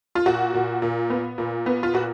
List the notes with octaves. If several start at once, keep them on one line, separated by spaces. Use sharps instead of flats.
F4
A#2 F#4
A#2
A#2
B3
A#2
B3
F4
A#2 F#4